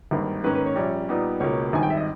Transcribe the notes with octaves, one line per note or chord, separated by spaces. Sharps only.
G#1 G2 D#3 A#3
G#2 D#3 A#3 C#4 B4
B4
C#5
A#1 A#2 G3 C#4
A#2 G3 B3 D#4
C#2 B2 A#3 C#5
G#1 G2 D#3 G#5
G5
E5
D#5